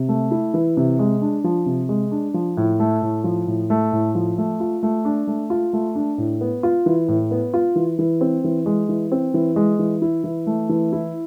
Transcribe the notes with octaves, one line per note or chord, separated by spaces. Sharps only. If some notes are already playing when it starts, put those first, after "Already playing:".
Already playing: C3
A3
E4
E3
C3
G#3
D4
F3
C3
G#3
D4
F3
A2
A3
A2
F3
A2
A3
A2
F3
A3
F4
A3
D4
A3
F4
A3
D4
A2
B3
F4
E3
A2
B3
F4
E3
E3
C4
E3
G#3
E3
C4
E3
G#3
E3
E4
E3
A3
E3
E4